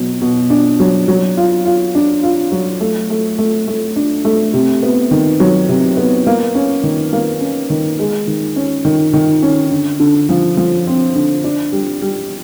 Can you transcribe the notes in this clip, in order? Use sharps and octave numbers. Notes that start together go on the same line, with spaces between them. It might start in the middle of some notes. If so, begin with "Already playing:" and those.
Already playing: B2 F#3
B2
D4
F#3
F#3
F4
F4
D4
F4
F#3
A3
A3
A3
A3
D4
A3
C3
B3
D#3
F#3
C3
B3
A#3
C#4
D#3
A#3
C#4
D#3
G#3
D#3
C#4
D#3
D#3
C#4
D3
D3
F3
F3
C4
D3
D4
G3
G3